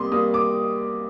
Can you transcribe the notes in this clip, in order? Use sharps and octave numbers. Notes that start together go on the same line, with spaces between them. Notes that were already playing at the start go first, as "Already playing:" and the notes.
Already playing: C3 G3 A#3 C6 D6 D#6
G3 A#3 D#6
D6